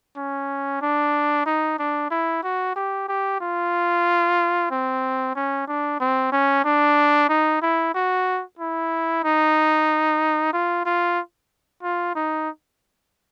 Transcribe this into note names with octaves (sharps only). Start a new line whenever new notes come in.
C#4
D4
D#4
D4
E4
F#4
G4
G4
F4
C4
C#4
D4
C4
C#4
D4
D#4
E4
F#4
E4
D#4
F4
F4
F4
D#4